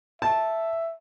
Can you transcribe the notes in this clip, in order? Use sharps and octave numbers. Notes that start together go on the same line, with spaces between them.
E5 A5